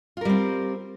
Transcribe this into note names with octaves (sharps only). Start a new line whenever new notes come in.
G3 C4 F4 A#4